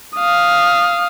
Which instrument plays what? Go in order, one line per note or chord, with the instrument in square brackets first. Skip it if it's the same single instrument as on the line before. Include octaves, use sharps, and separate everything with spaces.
[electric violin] F5 D#6